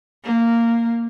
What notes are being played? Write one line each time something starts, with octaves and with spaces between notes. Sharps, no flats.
A#3